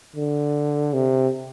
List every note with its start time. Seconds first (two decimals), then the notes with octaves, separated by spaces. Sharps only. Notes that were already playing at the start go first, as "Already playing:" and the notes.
0.16 D3
0.93 C3